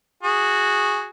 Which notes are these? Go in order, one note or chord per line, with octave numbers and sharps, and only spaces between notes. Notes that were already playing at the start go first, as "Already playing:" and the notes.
F#4 G#4